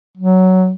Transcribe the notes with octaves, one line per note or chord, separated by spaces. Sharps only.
F#3